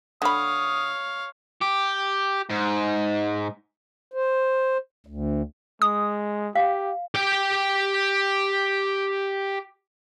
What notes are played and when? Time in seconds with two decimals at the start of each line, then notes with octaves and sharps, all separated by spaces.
0.22 D3 C#5 F5 B5 D#6
1.61 G4
2.50 G#2
4.14 C5
5.07 D2
5.82 G#3 D#6
6.55 G4 F5
7.15 G4 G5